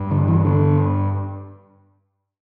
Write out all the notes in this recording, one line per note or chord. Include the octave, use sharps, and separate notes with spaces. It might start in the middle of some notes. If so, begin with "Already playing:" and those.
Already playing: G2
D3
E3
D3